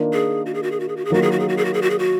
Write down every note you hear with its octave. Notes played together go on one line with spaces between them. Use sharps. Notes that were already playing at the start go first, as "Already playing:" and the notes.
Already playing: D#3 A#3 D4 F4
G#4
F#4
G#4
F#4
G#4
F#4
G#4
F#4
G#4
D#3 F#3 A#3 F4 F#4
G#4
F#4
G#4
F#4
G#4
F#4
G#4
F#4
G#4
F#4